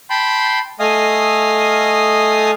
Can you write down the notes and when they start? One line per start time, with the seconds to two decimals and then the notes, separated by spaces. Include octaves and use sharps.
0.10 G5 A5 B5 C6
0.80 A3 D#5 F5 G#5 D#6